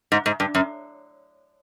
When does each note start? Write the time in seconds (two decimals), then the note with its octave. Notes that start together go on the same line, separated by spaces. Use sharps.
0.12 G#2
0.26 G#2
0.40 G2
0.55 F#2